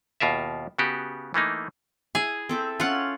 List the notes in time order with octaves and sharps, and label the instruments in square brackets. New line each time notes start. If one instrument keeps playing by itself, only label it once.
[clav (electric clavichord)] D#2 B2 F4 A#4 E5
C#3 B3 F#4 G4
E3 A3 A#3 D#4
[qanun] E4 [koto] G#4
[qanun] C4 A4 E5
[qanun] C#4 [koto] F4 F#5